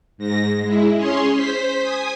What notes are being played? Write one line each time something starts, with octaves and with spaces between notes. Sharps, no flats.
G#2 A#6
G#3 E4
C#4 G#4 C#5 C6
C5 B6
G#5 D#6